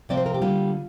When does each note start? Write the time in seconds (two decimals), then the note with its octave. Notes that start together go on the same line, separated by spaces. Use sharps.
0.09 C3 F3 C4 D5
0.17 C5
0.26 A#4
0.34 G4
0.42 D3 G3 A#3 F4